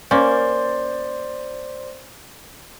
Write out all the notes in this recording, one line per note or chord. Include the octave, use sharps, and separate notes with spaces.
A#3 C#4 C5 D5 C6